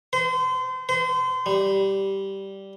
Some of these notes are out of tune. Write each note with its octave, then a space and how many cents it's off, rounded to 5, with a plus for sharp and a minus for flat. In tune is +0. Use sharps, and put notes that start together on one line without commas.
C5 -35
C5 -35
G3 -10